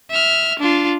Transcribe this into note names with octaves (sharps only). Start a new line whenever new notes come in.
E5 F6
D4 F4